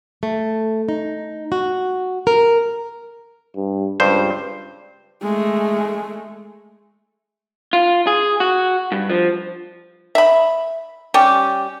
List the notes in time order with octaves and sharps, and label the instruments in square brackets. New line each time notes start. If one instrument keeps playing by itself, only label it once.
[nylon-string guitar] A3
D#4
F#4
A#4
[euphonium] G2
[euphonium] C#2 [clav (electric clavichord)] G2 C5
[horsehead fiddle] G#3 A3
[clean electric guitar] F4
G#4
F#4
G2
F3
[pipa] E5 B5
G3 C#4 G4